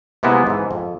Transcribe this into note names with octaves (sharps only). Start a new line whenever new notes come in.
C3 G#3 A#3 B3 E4
G#2 E3
F2